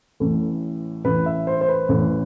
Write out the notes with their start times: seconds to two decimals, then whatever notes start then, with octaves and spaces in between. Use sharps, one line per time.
0.20 A1 A2 E3
1.05 A1 A2 E3 B4
1.26 E5
1.47 C5
1.61 C5
1.69 B4
1.89 A1 A2 E3